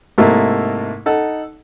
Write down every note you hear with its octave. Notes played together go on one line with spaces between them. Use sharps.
G#2 C3 A3 A#3 D#4 E4
D#4 A4 F#5